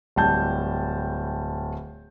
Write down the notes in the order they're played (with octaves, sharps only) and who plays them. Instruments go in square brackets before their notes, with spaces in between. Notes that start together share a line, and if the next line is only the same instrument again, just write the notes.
[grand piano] D1 G3 A5 G6